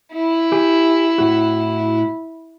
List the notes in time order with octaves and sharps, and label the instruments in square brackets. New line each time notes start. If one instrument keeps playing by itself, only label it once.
[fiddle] E4
[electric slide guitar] G4 G#5
A2 F#4